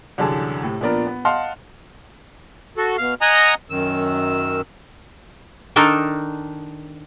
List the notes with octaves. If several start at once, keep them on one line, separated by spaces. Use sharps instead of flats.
C2 F#2 D3 E3 G#4 A5
A2 C3
A#2 F3 B3 D4 A#4
B3
D#5 F5 F#5 A5 C6 F6
F#4 A4
B2 F5
D#5 F#5 G#5 A#5 D#6
F#2 D#3 E6
D#3 D4 D#4 A4 A#4